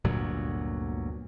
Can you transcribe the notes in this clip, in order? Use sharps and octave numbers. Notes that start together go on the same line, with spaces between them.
G1 D2 A#2 F#3